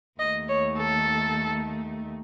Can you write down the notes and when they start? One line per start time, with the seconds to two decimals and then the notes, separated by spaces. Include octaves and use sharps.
0.19 D#2 D#3 A3 D#5
0.48 C#5
0.77 A4